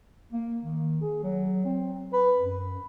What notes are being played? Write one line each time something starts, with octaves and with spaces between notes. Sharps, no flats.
A#3
D#3
G#4
F#3
C4
B4
F#2